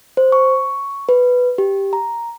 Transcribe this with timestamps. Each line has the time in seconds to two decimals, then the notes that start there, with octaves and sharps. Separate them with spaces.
0.17 C5
0.32 C#6
1.09 B4
1.58 G4
1.93 A#5